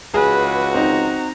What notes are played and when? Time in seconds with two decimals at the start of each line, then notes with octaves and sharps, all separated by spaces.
0.14 C#2 F#4 G#4 B4
0.74 C4 D#4 A#5